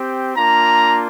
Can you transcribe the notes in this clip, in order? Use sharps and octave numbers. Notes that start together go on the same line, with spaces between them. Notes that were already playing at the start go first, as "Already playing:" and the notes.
Already playing: C4 G4
A#3 D4 F4 A#5